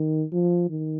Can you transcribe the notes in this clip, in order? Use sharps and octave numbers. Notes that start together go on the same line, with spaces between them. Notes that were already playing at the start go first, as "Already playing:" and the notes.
Already playing: D#3
F3
D#3